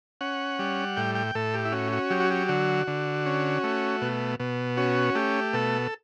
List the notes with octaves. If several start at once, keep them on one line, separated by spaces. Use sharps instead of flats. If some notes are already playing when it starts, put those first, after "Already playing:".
C#4 F#5
G3
A2 G5
G5
A2 A4
G4
E4
C#4 F#4
F#4
F#3 G4
F#4
G4
D3 F#4
D3
C#4
A3
B2
B2
C#4 F#4
A3 G4
B2 A4